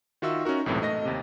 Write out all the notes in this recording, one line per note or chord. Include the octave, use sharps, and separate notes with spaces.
D#3 F4 F#4 E5 E6
C#4 D#4 F#4 A#4
B1 F2 A2 C3 E3 G#3
A3 D#5 A#6
D#2 C3